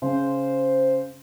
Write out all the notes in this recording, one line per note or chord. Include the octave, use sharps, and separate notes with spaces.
C#3 C5